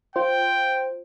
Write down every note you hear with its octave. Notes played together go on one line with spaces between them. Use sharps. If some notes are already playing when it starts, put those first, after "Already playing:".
F4 C5 G5